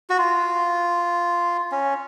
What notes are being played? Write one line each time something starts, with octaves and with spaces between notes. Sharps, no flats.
F#4
F4
C#4